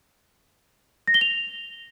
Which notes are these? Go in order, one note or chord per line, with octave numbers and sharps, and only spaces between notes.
A#6
G7
F7